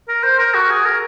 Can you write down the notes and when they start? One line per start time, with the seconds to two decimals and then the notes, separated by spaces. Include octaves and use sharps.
0.08 A#4
0.24 C5
0.39 A#4
0.54 F#4
0.70 G#4
0.85 A#4